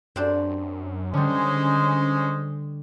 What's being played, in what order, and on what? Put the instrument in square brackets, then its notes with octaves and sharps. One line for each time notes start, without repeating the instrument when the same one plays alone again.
[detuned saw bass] F#2 [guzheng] C4 D4 G4
[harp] D3 G3 [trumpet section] G#3 C5 [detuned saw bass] C#4